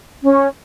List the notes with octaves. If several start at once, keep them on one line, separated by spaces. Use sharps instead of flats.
C#4